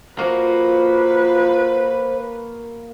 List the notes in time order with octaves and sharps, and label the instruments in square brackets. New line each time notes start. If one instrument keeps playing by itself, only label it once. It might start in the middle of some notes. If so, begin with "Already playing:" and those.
[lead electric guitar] A#3 F#4 [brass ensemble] F4 [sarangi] B4 [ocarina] C5